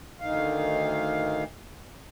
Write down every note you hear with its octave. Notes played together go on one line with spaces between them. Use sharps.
D2 D#3 F5